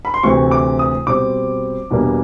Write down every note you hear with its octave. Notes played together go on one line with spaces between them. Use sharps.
B5
C6
D2 C3 E3 A3 C4 C#6
D6
D#6
B2 G3 C4 D6
E2 B2 G3 A#3 D4